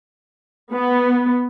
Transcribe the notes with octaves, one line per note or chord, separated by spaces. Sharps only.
B3